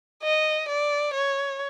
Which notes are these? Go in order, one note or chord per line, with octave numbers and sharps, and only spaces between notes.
D#5
D5
C#5